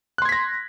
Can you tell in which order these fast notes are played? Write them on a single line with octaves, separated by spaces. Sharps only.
F#6 C6 G#6 B6 A#6